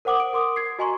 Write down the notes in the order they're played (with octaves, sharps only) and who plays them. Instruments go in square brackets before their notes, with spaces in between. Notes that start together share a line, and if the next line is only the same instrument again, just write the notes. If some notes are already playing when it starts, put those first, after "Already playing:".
[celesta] A#4 C5 F#5 D6 D#6 F#7
D7
A#4 C6 D6 D#6
G#6 C7
F#4 D#5 G#5 A#5 C6 C#6